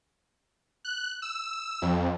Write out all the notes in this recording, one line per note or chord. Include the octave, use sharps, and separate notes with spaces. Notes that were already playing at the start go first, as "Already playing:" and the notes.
F#6
E6
F2